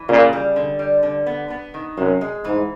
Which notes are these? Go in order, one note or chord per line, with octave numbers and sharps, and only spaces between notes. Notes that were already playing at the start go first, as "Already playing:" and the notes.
Already playing: E3
A#2 C#3
G3
D3
G3
D3
B3
B3
D#3
F#2 C3
G#3
G#2 E3